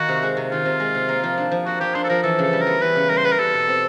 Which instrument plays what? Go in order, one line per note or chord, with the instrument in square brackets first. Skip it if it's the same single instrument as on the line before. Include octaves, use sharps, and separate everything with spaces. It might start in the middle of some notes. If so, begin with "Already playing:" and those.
Already playing: [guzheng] D#3 A#3 D#4 [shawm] F#4
[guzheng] C3
G#3
C3
[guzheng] D#3 [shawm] F4
[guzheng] C3
G#3
C3
A#3
F3
D4
F3
[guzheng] A#3 [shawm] F#4
[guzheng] F3 [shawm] G4
[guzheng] D4 [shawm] C5
[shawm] A4
[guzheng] F3 [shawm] A#4
[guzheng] E3 [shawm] A4
[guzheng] C#3 [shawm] A4
[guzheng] G3
[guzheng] B3 [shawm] A#4
[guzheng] E3 [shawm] B4
[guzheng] C#3
[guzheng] G3 [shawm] A#4
[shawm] C5
[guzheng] B3 [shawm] B4
[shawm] A#4
[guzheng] G3 [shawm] A4
[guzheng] B2
C4